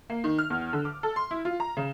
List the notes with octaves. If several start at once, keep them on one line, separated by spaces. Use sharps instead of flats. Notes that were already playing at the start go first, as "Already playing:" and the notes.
A#3
D#3
F6
E2
D3
D6
A4
C6
E4
F4
A#5
C#3